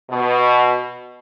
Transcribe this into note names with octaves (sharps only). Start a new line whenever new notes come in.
B2